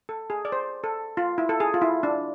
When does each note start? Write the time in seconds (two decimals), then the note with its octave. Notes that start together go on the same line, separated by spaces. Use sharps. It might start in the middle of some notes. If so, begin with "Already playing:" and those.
0.09 A4
0.30 G#4
0.45 D5
0.52 C5
0.84 A4
1.17 F4
1.38 E4
1.49 A4
1.60 G#4
1.74 F4
1.82 E4
2.03 D4